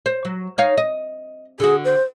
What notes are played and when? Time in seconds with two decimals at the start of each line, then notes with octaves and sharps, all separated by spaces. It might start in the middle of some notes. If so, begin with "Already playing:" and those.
0.06 C5
0.25 F#3
0.58 D#4 C#5 F5
0.77 D#5
1.60 D3 F#4 G#4
1.85 C5